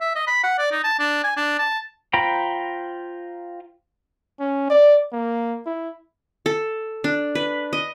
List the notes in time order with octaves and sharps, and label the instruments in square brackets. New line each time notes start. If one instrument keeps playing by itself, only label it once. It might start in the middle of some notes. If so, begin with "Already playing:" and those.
[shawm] E5
D#5
B5
F#5
D5
D#4
A5
D4
G#5
D4
A5
[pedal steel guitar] F4 C5 G5 A#5 B5
[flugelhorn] C#4
D5
A#3
E4
[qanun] A4
D4
B4
D#5